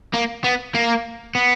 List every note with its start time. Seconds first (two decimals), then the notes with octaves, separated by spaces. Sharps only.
0.14 A#3
0.44 B3
0.75 A#3
1.35 B3